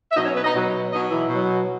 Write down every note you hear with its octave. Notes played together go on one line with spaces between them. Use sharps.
E5
B2 F#3 D#4 D#5
C#4 C#5
B3 B4
D#4 D#5
B2 F#3
B2 F#3 D#4 D#5
E3 E4
B2 F#3